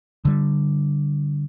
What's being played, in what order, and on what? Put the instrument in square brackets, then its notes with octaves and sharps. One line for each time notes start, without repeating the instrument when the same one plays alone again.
[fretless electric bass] D3 G3